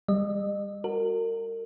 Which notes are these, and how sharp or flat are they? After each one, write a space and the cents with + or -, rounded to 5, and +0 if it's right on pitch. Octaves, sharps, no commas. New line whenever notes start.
G3 +25 D#5 -40
F#4 +0 A#4 -35